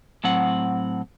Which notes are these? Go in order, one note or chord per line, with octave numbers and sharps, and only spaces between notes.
A2 F#3 C4 F#5